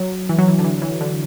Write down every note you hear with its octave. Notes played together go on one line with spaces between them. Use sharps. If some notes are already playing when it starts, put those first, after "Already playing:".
Already playing: F#3
E3
F#3
E3
D3
E3
E3
D3